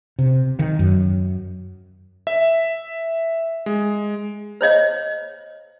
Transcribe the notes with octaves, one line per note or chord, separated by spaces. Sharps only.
C3
D#3
F#2
E5
G#3
C5 C#5 D#5 F5